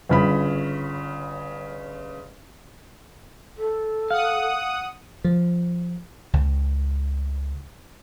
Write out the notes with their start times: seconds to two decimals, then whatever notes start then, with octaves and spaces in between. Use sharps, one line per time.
0.09 G1 C#3 B5
3.58 A4
4.11 F5 F#5 D#6
5.25 F3
6.33 C#2